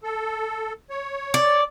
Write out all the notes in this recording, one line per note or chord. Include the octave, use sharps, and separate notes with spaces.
A4
C#5
D5